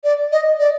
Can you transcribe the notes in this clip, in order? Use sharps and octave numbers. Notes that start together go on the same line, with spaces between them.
D5
D#5
D5